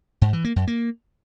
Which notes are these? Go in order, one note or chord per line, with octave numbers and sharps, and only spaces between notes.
G#2
E3
A#3
F#2
A#3